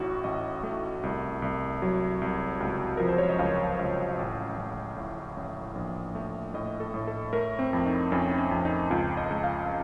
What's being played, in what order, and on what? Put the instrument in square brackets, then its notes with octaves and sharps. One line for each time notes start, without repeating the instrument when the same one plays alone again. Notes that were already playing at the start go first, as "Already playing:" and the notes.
Already playing: [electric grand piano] A1 A2 D#4 F#4
A1 D#5
A3
C2
C2
F#3
C2
C#2
F3 A#4
C5
C#5
D#5
C#2 F5
C#2
A1
A1
A2
A1
A#1
A3
A2 D#5
A4
A2
A4
A3 A#4
C4
F2
D#4
F2 C#4
D#4
C#4
F2
D#4
C#2 F4
D#5
C#2
F5